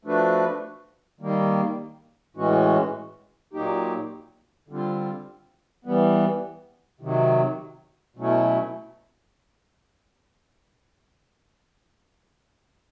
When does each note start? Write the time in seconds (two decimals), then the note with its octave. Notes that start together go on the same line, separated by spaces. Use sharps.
0.05 F3 A3 D4 F#4 B4
1.20 D#3 G3 A#3
2.36 A2 E3 G#3 C#4 F#4
3.53 A#2 F#3 A#3 D#4 G4
4.68 D3 G3 C4 F4
5.85 E3 G3 B3
7.01 C3 D#3 F#3
8.17 B2 F#3 A3 C#4 E4